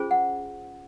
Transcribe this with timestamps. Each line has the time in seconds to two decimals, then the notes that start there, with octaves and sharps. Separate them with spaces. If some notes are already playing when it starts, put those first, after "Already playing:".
Already playing: C#4 F4 G#4 C5
0.11 F#5